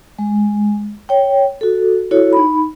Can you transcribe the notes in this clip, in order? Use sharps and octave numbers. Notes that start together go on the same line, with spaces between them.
G#3
C#5 G5
F#4 A4
E4 F#4 A4 C#5
D#4 B5